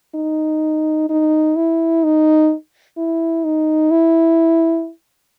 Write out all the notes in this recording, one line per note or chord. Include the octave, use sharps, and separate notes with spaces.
D#4
D#4
E4
D#4
E4
D#4
E4